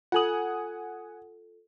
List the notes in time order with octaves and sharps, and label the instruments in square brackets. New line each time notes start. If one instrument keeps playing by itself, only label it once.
[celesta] F4 A4 F#7 [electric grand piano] F#5 G#5 D#6